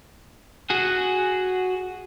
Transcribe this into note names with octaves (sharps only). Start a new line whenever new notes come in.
F#4 G#4